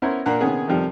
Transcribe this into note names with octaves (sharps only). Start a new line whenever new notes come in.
B3 C#4 E4 A#4 C5 C#5
A#2 A#3 D4 F#5
C3 D#3 B3 C#4 G#4
F2 C3 D#3 F3 G3